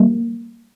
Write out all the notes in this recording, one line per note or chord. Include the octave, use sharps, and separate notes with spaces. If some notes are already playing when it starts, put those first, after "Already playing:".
Already playing: G3 A#3